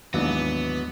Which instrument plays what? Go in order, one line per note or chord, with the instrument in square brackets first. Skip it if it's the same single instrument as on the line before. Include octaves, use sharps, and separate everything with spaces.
[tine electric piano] D#2 [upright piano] G#2 E3 D4 [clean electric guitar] F#3 [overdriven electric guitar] B3